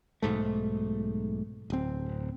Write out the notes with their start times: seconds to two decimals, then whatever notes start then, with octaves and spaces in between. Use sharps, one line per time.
0.22 B1 G#2 A3
1.70 D1 C4